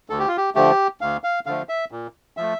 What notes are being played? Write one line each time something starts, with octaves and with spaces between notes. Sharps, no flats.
D2 A4
G4
F4
G4
D3 F3 A3 G4
D2 F5
F5
D3 F3 A3 F5
E5
A#2
F3 A3 E5